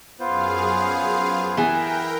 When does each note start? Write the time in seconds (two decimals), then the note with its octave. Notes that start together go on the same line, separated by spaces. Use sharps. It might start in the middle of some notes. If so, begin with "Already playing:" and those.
0.20 F#2 B3 F4 G#4 C5 F5
1.57 E3 B3 G#4 A#4 B4 E5 G5